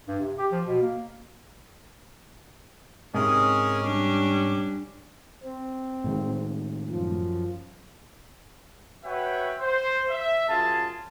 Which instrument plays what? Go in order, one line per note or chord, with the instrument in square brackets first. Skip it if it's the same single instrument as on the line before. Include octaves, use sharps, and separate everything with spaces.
[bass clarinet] G2
C3
G4
F3
B2
A#3
[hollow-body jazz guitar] G#2 C3 [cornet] C#4 [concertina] G#4 A#4 D#5
[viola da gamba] G3 D4 [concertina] D6
[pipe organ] C4
[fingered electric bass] A2 D#3 G#3
[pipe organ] F#2 F3
[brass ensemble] F#4 B4 C#5 E5 F#5 G5
C5
E5
F#2 F4 G#4 A5